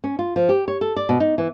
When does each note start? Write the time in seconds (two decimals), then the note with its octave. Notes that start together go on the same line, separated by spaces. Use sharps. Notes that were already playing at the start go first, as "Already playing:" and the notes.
0.04 C#4
0.19 F4
0.36 F3
0.49 G4
0.68 C#5
0.81 A4
0.96 D5
1.09 B2
1.20 D#4
1.38 E3